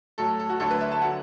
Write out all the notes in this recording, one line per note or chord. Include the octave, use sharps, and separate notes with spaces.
A2 F#3 A4
A4
F#4
D2 D3 F#3 A4
B4
E5
A5
D3 F#3 F#5